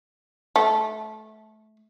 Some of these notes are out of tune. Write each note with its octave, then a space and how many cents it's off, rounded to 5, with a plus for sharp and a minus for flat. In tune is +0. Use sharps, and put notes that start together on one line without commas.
A3 -20